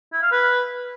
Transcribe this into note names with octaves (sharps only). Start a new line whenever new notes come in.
E4
F5
B4